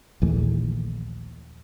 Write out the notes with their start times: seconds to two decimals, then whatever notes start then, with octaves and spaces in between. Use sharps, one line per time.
0.22 A#1 D#2 E3 A3